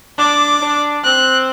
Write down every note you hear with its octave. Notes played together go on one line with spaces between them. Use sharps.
D4 D6
D4
C4 F#6